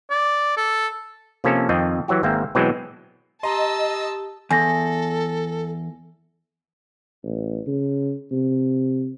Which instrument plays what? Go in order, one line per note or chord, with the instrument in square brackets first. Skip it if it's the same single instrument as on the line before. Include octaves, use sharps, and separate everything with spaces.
[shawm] D5
A4
[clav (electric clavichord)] C3 F3 A#3 C#4 A4
F2 D#3 C4 D#5
E3 F#3 F#4 G4
G#1 G#2 A#3 C4 E5
B2 E3 F#3 G#3 C4
[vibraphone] G4 [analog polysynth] D#5 [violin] A5 E6 [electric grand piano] A#5 C6
[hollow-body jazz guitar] E2 [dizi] A4 [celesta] G#5 A#6
[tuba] A1
C#3
C3